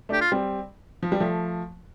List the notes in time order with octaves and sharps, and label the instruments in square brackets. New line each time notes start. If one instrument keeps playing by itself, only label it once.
[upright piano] A3 D4 [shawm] G4
[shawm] F4
[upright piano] G3 C4
F3
G3
F3 A3